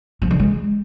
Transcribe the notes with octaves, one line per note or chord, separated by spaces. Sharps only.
F3
D3
G#3